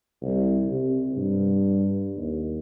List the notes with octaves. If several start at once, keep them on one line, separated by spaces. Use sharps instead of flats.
C2
C3
G2
D#2